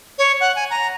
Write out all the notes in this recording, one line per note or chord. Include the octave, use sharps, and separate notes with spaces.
C#5
F#5
G#5
A#5